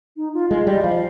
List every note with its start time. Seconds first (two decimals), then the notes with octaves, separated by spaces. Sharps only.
0.17 D#4
0.34 F4
0.50 G#3 F4
0.67 G3 D#5
0.80 D#5
0.84 F3 F5